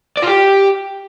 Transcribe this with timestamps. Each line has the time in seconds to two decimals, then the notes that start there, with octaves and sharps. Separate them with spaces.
0.17 D5
0.22 F4
0.27 G4